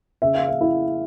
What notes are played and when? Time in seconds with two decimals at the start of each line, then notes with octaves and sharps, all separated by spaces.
0.22 C#3 E5
0.35 F5
0.48 E5
0.61 E4